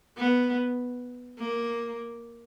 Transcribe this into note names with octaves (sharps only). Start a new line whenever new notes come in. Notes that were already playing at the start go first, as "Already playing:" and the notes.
B3
A#3